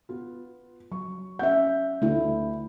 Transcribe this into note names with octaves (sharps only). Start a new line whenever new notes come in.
B3 F4
F#3 C#6
C#4 E5 F#5 G6
D2 D3 A3 E4